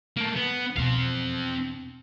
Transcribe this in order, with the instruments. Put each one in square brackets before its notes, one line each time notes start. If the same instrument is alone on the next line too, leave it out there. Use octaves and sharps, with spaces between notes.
[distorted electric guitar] A3 A#3
B3
[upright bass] E2 B2 [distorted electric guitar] C4 F5